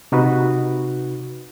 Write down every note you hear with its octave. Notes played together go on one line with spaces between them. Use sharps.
C3 D#4 F#4 B4